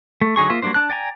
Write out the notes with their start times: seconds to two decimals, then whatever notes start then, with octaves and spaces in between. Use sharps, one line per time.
0.21 A3
0.36 D3 F#3 D#4 G#4 C#6
0.50 A#3 F4 C5 E5
0.62 F#3 G3 A#3 D4 C5
0.74 D4 A5 F#6
0.90 D5 G5 G#5 A#5